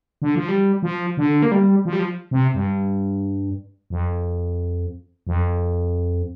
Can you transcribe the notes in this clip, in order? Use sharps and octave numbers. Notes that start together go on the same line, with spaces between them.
D3
F3
G3
F3
D3
A#3
G3
F3
G3
F3
C3
G2
F2
F2